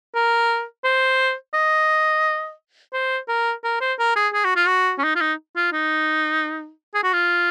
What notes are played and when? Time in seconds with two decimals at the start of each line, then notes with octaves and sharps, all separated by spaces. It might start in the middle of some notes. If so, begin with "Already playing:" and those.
0.15 A#4
0.84 C5
1.54 D#5
2.93 C5
3.28 A#4
3.64 A#4
3.81 C5
3.99 A#4
4.16 G#4
4.33 G#4
4.44 F#4
4.56 F4
4.67 F#4
4.98 C#4
5.04 D#4
5.15 F4
5.21 D#4
5.56 F4
5.72 D#4
6.94 G#4
7.03 F#4
7.13 F4